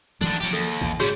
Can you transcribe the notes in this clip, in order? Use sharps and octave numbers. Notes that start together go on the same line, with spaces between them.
D#3 E3 F#3 A3 D4
F3 F#3 G4 C#5
D#2 A4
A#1 E2 E3
G#2 C#3 G3 C#4 F#4 G#4 C#5